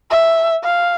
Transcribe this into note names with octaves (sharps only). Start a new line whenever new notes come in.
E5
F5